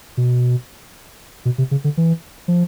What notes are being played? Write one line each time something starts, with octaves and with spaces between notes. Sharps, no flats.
B2
B2
C3
C#3
D3
E3
F3